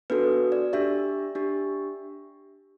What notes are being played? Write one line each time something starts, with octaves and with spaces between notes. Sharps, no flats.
B3 D4 F#4 A4 B4
D5
D4 G4 E5
D4 G4